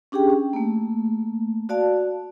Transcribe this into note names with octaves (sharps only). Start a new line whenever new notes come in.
C#4 D4 G4 G#4 G5
C#4
A3 A#3
F#4 D5 F5 A5